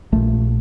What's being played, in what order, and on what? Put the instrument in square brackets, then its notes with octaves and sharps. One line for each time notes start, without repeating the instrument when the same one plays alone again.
[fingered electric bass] A#1 A#2 A3